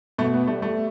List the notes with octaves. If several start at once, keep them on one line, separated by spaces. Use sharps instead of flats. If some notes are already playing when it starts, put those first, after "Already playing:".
B2 A3
B3
G3 A3
A3